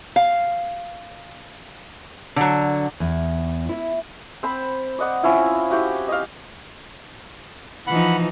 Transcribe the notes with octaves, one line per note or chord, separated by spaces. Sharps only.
F5
D3 F#3
E2
E4
C4 C5 B5
D5 D#5 F#5 D6
C4 C#4 E4 F4
E4 F#4 G4 G5
D#5 F5
E3 F3 D#4 F#5 B5